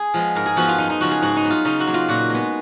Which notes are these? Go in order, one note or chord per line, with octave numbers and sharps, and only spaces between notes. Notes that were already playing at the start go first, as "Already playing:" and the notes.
Already playing: G#4
F3 G#3 B3
G#2 A#4
G#4
F3 B3 F#4
F4
F#2 D#4
D#4
C#3 F3 G#3 F#4
G#4
G#2 F#4
D#4
F#3 B3
F4
C#3 D#4
F#4
F#3 A#3
F4
A#2 F#4
G#3 B3